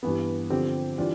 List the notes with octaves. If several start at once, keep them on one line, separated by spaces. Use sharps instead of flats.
G2 E3 B3
D3 F3 C4 G4
E3 G3 D4 F4